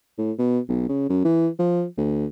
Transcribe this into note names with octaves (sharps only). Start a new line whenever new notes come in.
A2
B2
B1
C#3
F#2
E3
F3
D2